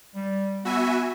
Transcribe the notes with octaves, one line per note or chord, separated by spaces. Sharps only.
G3
B3 F#4 E5 G#5